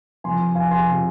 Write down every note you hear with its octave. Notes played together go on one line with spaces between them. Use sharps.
F2 C3 F3 G#5 C6
F5 G#5
G#5 C6
C3 F3